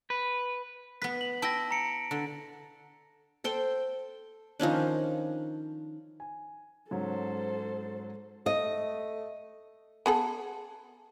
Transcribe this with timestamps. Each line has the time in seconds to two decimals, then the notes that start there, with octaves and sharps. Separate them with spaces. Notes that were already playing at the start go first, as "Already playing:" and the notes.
0.10 B4
1.02 B3 B4 B6
1.21 F#7
1.42 E4 G5 A5 A#6
1.71 A#5 C#7 D7
2.11 D3
3.44 A4 C5 G5
4.60 D#3 F3 C#4 D4
6.20 G#5
6.91 G#2 F#3 C#4 A4 C5
8.46 A3 D#5
10.06 B3 G#4 A4